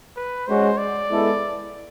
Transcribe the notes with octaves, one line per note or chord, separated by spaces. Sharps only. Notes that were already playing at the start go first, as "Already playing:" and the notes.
B4
G#3 C#4 F#4 C5
D5
G#3 B3 E4 A4